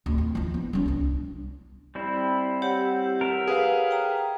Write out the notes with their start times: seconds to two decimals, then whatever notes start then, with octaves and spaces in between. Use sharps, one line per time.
0.06 D1
0.18 F2
0.35 F3 E4
0.54 B3
0.73 F#2 E3
0.86 C2 D4
1.95 G3 C4 E4
2.62 G4 C#5 F#5
3.21 A#4 E5
3.47 G#4 B4 F5
3.91 G5 A#5